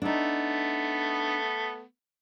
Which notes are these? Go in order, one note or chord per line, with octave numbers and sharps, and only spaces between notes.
A3 B3 D4 D#4